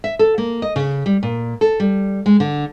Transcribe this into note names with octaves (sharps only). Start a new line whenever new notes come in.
E5
A4
A#3
D#5
C#3
G3
A#2
A4
G3
G#3
D3